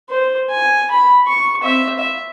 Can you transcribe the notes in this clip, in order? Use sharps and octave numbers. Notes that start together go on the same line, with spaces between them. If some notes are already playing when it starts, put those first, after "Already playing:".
C5
G#5
B5
C#6
C4 E5
E5